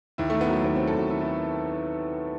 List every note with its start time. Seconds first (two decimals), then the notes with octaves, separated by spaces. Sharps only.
0.18 D#2 E4
0.30 D#3 A3
0.41 B3
0.49 F#3 A3
0.64 D#2 B3
0.75 F#3 C4
0.88 A4
0.94 D#2 F#4
1.10 D#3 E4
1.21 E4